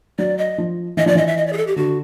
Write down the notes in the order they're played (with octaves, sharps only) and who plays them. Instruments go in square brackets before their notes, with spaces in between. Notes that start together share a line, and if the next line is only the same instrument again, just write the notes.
[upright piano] F#3 [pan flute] D5
[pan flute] D#5
[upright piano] F3
[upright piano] E3 [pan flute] D#5
[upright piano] F3 [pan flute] D5
[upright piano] E3 [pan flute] D#5
[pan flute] E5
D#5
D5
G#4
A4
G4
[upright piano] D3 [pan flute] F#4